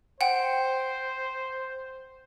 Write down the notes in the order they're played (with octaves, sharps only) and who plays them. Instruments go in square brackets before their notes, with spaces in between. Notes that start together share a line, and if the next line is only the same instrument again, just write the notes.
[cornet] C5 [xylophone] F#5 G5